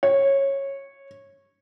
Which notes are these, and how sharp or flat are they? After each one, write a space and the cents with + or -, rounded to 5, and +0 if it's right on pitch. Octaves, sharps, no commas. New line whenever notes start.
C#5 -15